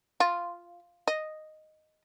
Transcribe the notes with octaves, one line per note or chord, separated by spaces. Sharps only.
F4
D#5